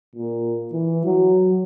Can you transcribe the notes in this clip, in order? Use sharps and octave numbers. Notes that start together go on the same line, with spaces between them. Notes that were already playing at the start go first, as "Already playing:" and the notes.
A#2
E3
F#3